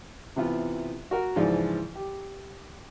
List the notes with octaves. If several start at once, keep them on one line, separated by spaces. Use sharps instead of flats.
C3 E3 B3 F4
F#4 A#4 F#5
G#2 C#3 E3 F3 F4 D5
G4